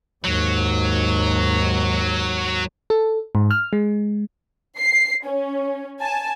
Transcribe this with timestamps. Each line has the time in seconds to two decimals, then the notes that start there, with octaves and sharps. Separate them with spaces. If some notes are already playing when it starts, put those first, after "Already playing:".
0.25 D#2 G#2 F#3
2.90 A4
3.35 G#2
3.51 F6
3.73 G#3
4.78 C7
5.26 C#4
5.99 G#5 A5